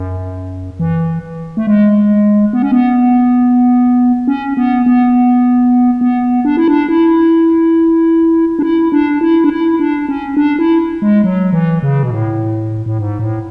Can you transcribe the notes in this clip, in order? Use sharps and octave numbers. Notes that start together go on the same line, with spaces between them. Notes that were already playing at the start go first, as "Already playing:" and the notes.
Already playing: F#2
E3
A3
G#3
B3
C#4
B3
C#4
B3
B3
B3
D4
E4
D4
E4
D4
E4
D4
E4
D4
E4
D4
C#4
D4
E4
G#3
F#3
E3
C#3
B2
A2
A2
G#2
A2